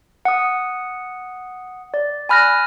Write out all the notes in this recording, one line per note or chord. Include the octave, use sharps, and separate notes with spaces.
F#5 D#6
D5
G#5 B5 F6 F#6 A#6